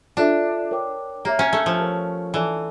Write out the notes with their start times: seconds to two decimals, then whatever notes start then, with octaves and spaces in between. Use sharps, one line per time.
0.17 D4 F4 A4 E5
0.71 A#4 C#5 G5 D6
1.25 A#3 G4 C#5 E5 A#5
1.39 C#4
1.53 A3
1.66 F3
1.79 G4 A#4 C#5
2.34 E3 A4 D5 A5